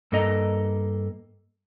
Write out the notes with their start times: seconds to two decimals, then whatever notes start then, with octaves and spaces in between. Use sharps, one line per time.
0.12 G2 A#3 A4 D#5 A#5